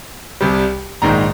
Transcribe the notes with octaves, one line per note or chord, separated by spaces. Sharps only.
C2 C3 G3
A#1 G#2 D#3 G#3 A#5